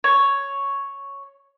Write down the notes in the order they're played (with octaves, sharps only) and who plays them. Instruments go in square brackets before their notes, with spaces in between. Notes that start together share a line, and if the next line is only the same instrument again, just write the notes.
[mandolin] C#5